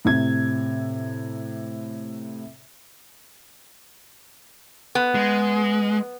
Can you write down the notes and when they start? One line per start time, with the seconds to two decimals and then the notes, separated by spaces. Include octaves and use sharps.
0.05 A2 C3 G#6
4.95 B3
5.15 G#3